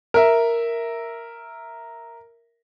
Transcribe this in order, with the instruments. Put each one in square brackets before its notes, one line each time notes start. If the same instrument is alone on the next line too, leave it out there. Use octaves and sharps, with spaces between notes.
[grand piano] A#4 E5